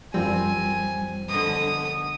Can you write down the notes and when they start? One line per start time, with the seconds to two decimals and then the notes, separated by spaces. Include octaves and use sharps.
0.14 F#2 F3 G3 C4 G#5
1.29 B2 D3 D#6